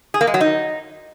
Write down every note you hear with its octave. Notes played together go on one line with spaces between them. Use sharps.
G#4
A#3
G#3
F#3
D#4